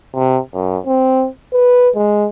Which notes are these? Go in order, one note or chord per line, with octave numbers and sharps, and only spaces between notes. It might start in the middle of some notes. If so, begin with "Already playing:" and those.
C3
F#2
C4
B4
G#3